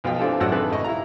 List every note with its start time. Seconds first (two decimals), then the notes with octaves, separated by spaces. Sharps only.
0.04 B1 B2 F3 F5 G5
0.19 E3 C4 D4 F4 G4 A4
0.40 A1 F#2 F#3 D4 F#5 E6
0.51 C3 D#3 D4 G#4 A4 B4
0.72 A1 D#5 C#6
0.84 E4 G4 F5 A#5